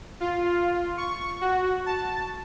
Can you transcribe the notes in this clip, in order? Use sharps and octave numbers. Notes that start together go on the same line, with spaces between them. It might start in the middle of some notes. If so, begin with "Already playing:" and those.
F4
C#6
F#4
A5